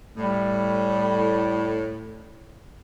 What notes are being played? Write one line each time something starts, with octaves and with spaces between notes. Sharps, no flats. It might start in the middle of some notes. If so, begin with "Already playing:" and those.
A2 G3